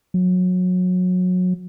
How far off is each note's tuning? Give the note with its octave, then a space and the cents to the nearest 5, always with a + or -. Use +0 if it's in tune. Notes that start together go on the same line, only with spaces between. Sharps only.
F#3 -25